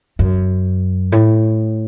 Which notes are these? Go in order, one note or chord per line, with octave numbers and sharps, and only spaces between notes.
F#2
A2